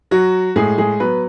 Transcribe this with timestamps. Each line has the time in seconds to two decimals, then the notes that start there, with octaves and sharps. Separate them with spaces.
0.11 F#3 F#4
0.56 A2 G#3 G#4
0.78 G#3 G#4
1.00 F#3 B3 B4